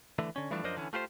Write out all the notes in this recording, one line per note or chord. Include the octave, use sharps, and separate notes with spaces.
D3 E3 A3
D3 C#4
E3 F3 G3 A3 D4
F#2 F3 D4 A#4 C5 D#5
D3 E3 C#4
A3 F4 G4 B4 C5